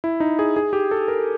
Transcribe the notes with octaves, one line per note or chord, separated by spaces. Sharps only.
E4
D#4
G#4
G#4
G4
A4
A#4